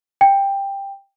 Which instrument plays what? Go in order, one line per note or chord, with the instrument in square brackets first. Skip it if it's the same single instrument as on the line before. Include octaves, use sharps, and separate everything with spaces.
[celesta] G5